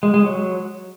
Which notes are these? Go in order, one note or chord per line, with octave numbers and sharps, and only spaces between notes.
G#3
G#3
F#3